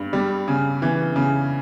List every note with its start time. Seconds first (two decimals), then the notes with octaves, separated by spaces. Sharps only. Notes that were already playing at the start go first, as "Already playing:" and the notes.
Already playing: G2
0.13 G3
0.48 C#3
0.82 E3
1.16 C#3